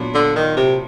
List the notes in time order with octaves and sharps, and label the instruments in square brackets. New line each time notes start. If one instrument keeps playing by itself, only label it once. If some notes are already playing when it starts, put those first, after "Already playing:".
Already playing: [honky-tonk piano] A#2 F#3 B3 D4
[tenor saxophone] D3
D#3
C3